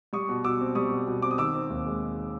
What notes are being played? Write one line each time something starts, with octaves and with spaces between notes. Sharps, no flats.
G3 C#6 D#6
B2
B2 D6 E6
C4
G3 C#6 D#6
B2
B2
C4 D6
D#6
D#3 D6 E6
C4
D#2
G#3